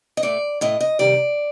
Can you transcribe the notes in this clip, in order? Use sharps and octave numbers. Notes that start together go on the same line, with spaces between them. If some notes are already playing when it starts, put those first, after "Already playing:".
D#5
A2 A3 D5
A2 A3 D#5
D#5
C3 D#3 G3 D5